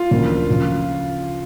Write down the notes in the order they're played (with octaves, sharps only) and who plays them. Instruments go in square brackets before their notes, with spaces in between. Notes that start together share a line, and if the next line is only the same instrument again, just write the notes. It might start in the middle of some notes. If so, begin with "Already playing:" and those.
Already playing: [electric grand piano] F4
[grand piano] D2 C#3 F3 A#3 D4
C#3 F3